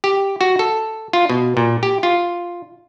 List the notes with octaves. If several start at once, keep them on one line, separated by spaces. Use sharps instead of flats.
G4
F#4
A4
F4
B2
A#2
G4
F4